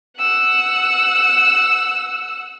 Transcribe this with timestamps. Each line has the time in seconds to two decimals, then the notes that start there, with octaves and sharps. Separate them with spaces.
0.18 F#5 E6